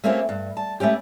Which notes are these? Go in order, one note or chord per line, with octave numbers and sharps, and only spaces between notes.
A3 A#3 C4 C#4 E4 G4
G2
A5
A3 B3 C#4 G4